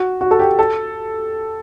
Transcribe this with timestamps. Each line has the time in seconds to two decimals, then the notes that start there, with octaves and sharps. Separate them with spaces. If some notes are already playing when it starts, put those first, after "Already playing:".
Already playing: F#4
0.21 F#4
0.31 A4
0.39 G4
0.59 A4